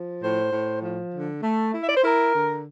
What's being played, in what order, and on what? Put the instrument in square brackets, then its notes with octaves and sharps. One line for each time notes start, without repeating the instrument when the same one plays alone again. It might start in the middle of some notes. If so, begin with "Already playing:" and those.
Already playing: [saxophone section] F3
A2 C5
A2
F3
D3
A3
E4
E5
D5
C5
E4 A#4
D3